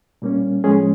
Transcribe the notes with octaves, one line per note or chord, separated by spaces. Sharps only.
A#2 G3 A#3 C#4
A2 F3 G#3 C#4 G#4